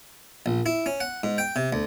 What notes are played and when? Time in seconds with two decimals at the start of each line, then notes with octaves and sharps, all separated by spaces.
0.46 A#1
0.66 E4
0.86 C#4
1.00 F#5
1.23 G#2
1.38 G5
1.56 C3
1.73 D2